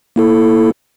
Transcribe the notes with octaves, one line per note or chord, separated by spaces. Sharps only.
A#3 E4 A4